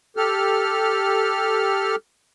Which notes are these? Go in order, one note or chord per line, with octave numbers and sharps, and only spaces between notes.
G4 A4 F6